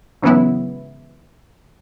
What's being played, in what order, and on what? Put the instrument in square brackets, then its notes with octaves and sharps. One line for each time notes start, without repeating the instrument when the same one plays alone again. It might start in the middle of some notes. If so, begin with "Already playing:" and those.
[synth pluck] G#2 C#3 E3 F#3 B3 E4